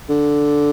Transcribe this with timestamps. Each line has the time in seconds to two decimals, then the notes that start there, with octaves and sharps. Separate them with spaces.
0.09 D3